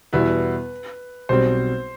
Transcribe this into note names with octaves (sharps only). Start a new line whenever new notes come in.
E2 B2 G3 B3 E4 B4
B1 B2 G3 C4 C5